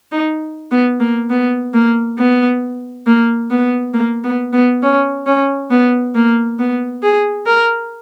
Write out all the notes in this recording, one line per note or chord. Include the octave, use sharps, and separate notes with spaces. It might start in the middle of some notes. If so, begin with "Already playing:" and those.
D#4
B3
A#3
B3
A#3
B3
A#3
B3
A#3
B3
B3
C#4
C#4
B3
A#3
B3
G#4
A#4